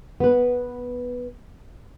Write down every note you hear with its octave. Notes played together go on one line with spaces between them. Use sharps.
B3 B4